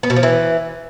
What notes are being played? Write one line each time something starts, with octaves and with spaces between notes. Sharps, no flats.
B3
B2
F3
E3